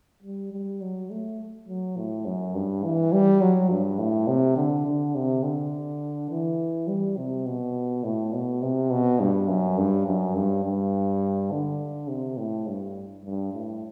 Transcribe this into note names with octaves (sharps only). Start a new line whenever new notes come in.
G3
G3
F#3
A3
F#3
A2
F#2
G2
E3
G3
F#3
G2
A2
C3
D3
D3
C3
D3
E3
G3
C3
B2
A2
B2
C3
B2
G2
F#2
G2
F#2
G2
G2
D3
C3
A2
G2
G2
A2